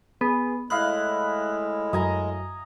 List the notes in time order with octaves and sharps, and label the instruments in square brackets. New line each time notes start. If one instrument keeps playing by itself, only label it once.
[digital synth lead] B3 [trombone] G#4
[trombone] A2 [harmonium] G#3 [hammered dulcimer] E4 D#5 F5 [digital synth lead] F#6
[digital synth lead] F#2 [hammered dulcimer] D#5 G#5 A#5